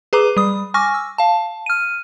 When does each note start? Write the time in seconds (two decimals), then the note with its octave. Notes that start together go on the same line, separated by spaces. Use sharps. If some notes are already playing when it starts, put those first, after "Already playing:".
0.13 G#4 B4 A#5 D6
0.37 G3 D#6
0.74 G#5 C#6 D6 F6 A#6
0.94 E6
1.18 F5 A5
1.66 F6 D#7